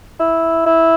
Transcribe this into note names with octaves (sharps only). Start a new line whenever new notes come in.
E4
E4